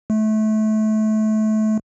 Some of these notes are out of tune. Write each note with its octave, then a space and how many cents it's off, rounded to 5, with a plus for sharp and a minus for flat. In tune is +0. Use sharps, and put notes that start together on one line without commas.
A3 -25